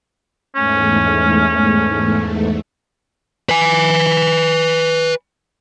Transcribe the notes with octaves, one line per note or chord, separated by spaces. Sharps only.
E2 G#2 A3 C#4
B4 G#5